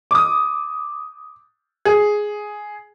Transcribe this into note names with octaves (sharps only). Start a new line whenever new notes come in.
D6 D#6
G#4